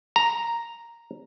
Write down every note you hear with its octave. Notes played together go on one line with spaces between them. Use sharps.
A#5